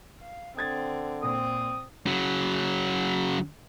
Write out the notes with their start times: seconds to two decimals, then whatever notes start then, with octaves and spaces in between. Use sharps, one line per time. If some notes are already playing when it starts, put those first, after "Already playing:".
0.21 F5
0.57 D3 C4 D#6 G#6 A6
1.23 A#2 C4 D#6
2.06 C#3 F#3